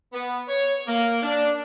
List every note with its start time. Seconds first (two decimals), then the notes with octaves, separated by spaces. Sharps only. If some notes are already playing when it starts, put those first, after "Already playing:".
0.13 B3
0.48 C#5
0.87 A#3
1.22 D4